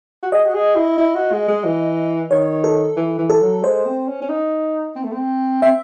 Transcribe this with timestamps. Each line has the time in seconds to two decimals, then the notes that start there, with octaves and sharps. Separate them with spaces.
0.23 F#4
0.32 G#4 D#5
0.46 F#4
0.54 G#4
0.76 E4
0.98 E4
1.15 F#4
1.32 G#3
1.48 G#3
1.64 E3
2.31 D#3 C#5
2.64 A4
2.97 E3
3.18 E3
3.30 A4
3.41 F#3
3.63 G#3 C5
3.86 C4
4.07 C#4
4.22 C#4
4.29 D#4
4.96 C4
5.04 A3
5.12 C4
5.62 C4 E5